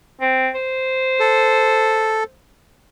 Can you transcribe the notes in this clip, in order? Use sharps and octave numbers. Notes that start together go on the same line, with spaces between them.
C4
C5
A4